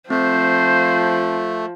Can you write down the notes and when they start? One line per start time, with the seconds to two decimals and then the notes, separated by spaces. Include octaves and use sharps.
0.10 F3 A3 C4 C5